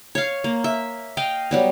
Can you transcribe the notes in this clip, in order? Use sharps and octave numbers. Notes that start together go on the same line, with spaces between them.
C#5 F5
A#3
E5
D#5 F5 G5
F#3 G3 B3